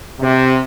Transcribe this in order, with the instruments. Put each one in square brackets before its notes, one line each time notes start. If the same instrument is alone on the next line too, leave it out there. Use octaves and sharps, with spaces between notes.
[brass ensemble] C3